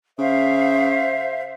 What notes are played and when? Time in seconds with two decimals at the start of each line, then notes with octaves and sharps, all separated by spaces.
0.19 C#3 C5 E5 F5